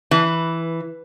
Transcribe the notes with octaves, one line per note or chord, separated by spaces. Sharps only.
E3